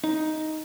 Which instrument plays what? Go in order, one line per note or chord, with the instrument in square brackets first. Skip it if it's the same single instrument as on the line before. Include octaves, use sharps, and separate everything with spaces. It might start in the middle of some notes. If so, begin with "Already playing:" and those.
[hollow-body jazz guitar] D#4